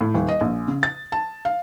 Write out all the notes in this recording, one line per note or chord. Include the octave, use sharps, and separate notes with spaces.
A2
D#1
D#5
A#1
C#3
A6
A5
F5